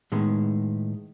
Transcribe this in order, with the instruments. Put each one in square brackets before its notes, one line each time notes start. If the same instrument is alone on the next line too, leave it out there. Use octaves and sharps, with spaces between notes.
[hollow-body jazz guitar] A2 D#3 G#3 B3